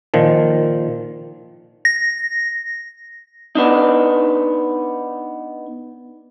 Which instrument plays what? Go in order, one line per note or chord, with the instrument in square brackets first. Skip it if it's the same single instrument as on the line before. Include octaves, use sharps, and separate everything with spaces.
[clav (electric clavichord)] A#2 D#3 F3
[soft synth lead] A#6
[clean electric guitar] B3 D4 D#4